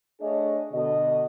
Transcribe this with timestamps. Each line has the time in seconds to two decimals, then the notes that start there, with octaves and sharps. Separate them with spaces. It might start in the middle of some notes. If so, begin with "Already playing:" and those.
0.21 A3 D4 G#4 C#5 D#5
0.72 B2 D3 D#5